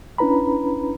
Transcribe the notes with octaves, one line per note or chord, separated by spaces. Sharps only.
C#4 D4 E4 B4 A#5 B5